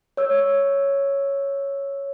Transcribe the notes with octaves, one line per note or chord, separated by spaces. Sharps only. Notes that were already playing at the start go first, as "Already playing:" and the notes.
C#5 E6